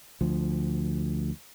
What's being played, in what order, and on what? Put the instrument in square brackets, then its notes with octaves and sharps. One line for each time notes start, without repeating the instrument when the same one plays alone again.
[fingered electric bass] D2 F3